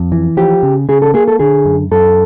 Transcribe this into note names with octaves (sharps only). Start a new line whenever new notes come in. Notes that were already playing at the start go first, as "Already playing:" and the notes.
Already playing: F2
E3
F3 G4
C#3
C#3 G#4
A4
A#3 G#4
A4
D3 G#4
F#2
F#2 A4